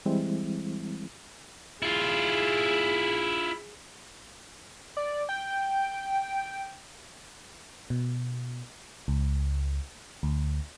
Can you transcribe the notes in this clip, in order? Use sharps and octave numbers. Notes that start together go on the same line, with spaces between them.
E3 G3 G#3 C4 E4
E4 F4 G#4
D5
G5
B2
C#2
D2